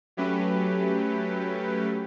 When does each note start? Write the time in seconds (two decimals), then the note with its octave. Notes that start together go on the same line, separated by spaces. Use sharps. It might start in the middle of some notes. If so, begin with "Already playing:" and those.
0.17 F#3 A3 C#4 G4 B4